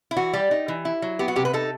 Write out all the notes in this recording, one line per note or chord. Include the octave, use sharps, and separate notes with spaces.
E4
E3 F#4
G3 G4
D#4
E3
E4
F#3
B3 G4
F#4
C3 G4
B4
D#4 A4